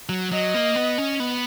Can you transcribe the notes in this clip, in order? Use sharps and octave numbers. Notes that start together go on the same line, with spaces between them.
F#3
F#3 D#5
A#3
B3
C#4
B3